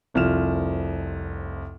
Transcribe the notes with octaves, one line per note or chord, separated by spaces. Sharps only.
F1 C2 F3 F6 E7